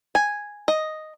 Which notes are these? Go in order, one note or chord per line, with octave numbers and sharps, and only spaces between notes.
G#5
D#5